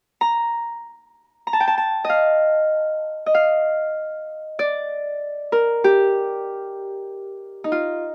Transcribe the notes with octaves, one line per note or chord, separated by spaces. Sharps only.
A#5
A#5
A5
G5
A5
A5
D#5 F5
D#5
F5
D5
A#4
G4
D#4
F4